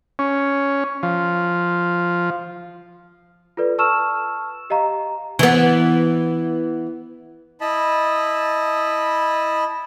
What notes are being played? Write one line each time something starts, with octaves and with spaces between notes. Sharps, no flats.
C#4
F3
F4 A4 B4 D5
A5 C#6 E6 F6 E7
G4 D#5 F5 A#5
E3 B3
E4 D#5 A5 B5